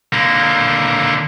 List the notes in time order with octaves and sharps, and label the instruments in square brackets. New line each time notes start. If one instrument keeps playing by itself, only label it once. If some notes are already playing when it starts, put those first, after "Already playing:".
[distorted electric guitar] D3 A#3